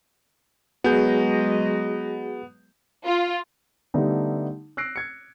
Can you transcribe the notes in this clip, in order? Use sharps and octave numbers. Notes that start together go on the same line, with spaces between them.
F#3 G#3 B3 F#4 G#4 D#5 G6
F4
D3 G3 A3 B3 D#4 G4
E6 F#6 A#6 C7 D7
G#6 C#7